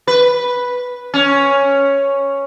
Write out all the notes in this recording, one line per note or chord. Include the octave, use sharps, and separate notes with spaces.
B4
C#4